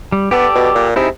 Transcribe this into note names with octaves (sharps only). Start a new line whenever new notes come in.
G3
B3 G4 A4 D5
B2
A#2
C3 D#4 E4 G#4